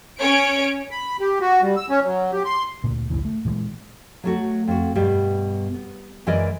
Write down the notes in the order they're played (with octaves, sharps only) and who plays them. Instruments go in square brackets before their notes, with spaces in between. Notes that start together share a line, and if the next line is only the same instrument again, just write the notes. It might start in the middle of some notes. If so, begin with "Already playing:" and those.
[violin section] C#4 C#5 D7
[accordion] B5
G4
F#4
G3
E6
C#4
F#3
G4
C6
[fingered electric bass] D2 A#2
A1 D2 G#2 E3
A3
A#2 E3 F3 G#3
[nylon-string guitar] F#3 A3 F#4
F2 F#4
G2 B2 G3
B3
F#2 E3 G#3 A#4 D5 D#5